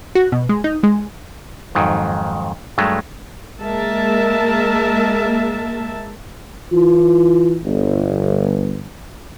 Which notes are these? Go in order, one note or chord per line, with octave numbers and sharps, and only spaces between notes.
F#4
B2
G#3
D#4
G#3
F2 G#2 D#3 F#3
G2 F#3 G#3 A3
G#3 A#3 A#4 E5 A5
E3 E4 F4
G1